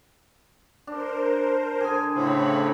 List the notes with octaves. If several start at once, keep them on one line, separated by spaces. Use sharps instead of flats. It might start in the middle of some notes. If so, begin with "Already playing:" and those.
D4 A#4 C5
D3 G#4 G#5
A2 C#3 C4 C#5 B5